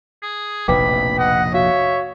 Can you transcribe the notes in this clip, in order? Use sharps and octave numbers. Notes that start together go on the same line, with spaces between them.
G#4
F1 A#1 B2 B4 G5 B5 D6
D#5 F#5
F#4 C#5 E5 F5